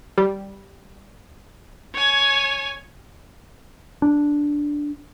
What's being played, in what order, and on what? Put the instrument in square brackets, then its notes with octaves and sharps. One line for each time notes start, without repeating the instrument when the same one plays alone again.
[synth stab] G3
[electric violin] C#5 G#5
[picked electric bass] D4